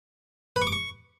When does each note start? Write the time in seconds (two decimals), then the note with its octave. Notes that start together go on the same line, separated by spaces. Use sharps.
0.56 B4
0.62 C#6
0.67 D6
0.72 C#6